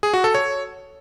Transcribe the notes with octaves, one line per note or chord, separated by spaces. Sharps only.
G#4
F#4
A4
C#5